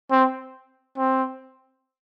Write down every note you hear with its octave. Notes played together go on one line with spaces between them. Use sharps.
C4
C4